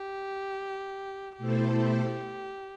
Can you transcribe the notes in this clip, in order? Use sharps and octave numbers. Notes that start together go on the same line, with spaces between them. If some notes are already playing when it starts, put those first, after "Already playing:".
Already playing: G4
B2 A3 E4 G4 A4 C5